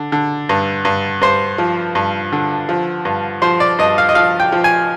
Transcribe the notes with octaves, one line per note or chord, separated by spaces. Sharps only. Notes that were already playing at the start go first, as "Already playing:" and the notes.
Already playing: D3
D3
G2
G2
G2 C5
F3
G2
D3
F3
G2
F3 C5
D5
G2 D#5
F5
D#5
F3 F5
G5
F3
G#5